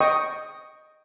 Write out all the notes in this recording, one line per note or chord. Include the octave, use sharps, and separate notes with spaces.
D#5 G5 C#6 D#6